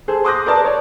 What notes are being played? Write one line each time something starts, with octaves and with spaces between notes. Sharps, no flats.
G#4 A4 C5
C6 D6 D#6 F#6 G6 A#6
A#4 B4 D5 A5
C#5 D5